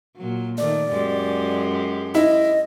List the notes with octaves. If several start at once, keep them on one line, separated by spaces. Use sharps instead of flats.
A#2 F#3
D#3 A3 D5
F#2 G#3 G4
E4 D#5